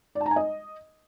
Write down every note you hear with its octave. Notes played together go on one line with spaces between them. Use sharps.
D5
A5
A#5
G#5
D#5